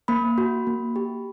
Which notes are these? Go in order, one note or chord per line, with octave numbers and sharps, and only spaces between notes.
A#3 B5
F#4
A#3
G4